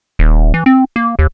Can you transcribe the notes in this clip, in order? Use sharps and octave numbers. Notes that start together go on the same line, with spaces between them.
D#1
E3
C4
A#3
D#2